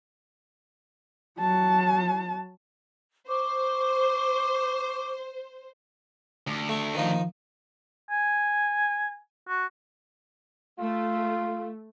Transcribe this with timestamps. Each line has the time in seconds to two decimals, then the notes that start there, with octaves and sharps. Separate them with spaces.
1.39 F#3 A5
3.28 C5 C#6 D6
6.47 D2
6.69 A3 C#6
6.94 D#3 F3 D#4
8.10 G#5
9.48 F#4
10.79 A3 F4